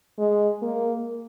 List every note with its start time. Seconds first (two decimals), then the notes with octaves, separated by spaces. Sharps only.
0.19 G#3
0.62 A#3